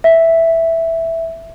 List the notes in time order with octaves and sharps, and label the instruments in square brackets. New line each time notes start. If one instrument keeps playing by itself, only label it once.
[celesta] E5